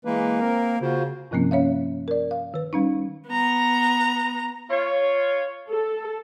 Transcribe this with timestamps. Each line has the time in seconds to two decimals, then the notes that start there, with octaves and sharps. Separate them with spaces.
0.05 E3 G#3 A#3 B4
0.40 C4 A#4
0.81 C#3 F4 F#4 C5
1.31 G2 C3 F3 A#3 C4 C#4
1.51 C#4 C#5 E5 F5
2.08 A#4 D5
2.31 F5
2.54 D#3 B4
2.73 G3 C#4 D#4
3.28 B3 A#5
4.70 F4 C#5
5.70 A4